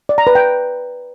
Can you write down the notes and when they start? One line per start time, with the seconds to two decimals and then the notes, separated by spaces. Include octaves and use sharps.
0.09 D5
0.18 A#5
0.27 B4
0.35 G5